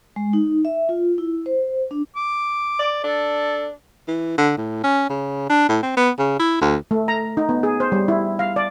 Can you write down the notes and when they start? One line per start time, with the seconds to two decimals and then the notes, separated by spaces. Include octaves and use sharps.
0.16 G#3
0.33 D#4
0.65 E5
0.89 F4
1.18 E4
1.46 C5
1.91 D4
2.16 D6
2.79 D5
3.04 D4 A4
4.08 E3
4.38 D3
4.57 A2
4.84 C#4
5.10 C#3
5.49 D4
5.69 A2
5.83 C4
5.97 B3
6.19 C#3
6.40 E4
6.61 D2
6.91 A3
7.08 A#5
7.37 D#4
7.49 B3
7.63 G#4
7.80 C5
7.92 G3
8.08 E4
8.39 F5
8.56 D5